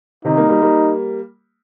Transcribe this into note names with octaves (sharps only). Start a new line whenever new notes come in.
C3 D#3 D#4
G3 A#3
G3 A#3
G3 A#3